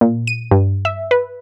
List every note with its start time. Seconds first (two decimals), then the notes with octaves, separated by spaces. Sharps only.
0.01 A#2
0.27 D#7
0.51 G2
0.85 E5
1.11 B4